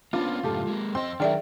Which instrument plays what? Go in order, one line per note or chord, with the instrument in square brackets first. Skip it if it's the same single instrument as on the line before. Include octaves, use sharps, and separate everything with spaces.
[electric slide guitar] A#3 B3 C#4 [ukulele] D4 [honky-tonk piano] F4
[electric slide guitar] F#2 A2 C#3 [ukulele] G4 A4
[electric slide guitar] G#3 A#3
[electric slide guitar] F2 D#5 [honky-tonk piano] C4 C6
[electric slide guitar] D#3 F#3 [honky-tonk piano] D4 [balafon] G#4 D5 E5 [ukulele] A#4 G5